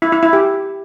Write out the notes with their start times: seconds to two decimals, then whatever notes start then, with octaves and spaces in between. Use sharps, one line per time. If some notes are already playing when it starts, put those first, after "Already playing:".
0.02 E4
0.12 E4
0.23 E4
0.33 G4